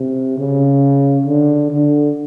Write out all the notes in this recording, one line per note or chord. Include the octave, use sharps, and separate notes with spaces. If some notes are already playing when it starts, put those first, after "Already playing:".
Already playing: C3
C#3
D3
D3